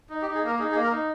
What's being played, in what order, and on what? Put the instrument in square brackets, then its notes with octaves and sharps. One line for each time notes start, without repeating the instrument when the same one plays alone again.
[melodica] D#4
G4
D#4
G#4
A#3 A#4
D#4 G#4
G#4
A#3
A#4
D#4